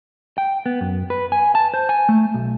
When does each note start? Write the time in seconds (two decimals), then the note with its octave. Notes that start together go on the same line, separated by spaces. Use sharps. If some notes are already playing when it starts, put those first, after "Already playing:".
0.38 G5
0.66 B3
0.81 F#2
1.10 B4
1.32 G#5
1.55 A5
1.74 C5
1.89 G#5
2.09 A3
2.34 B1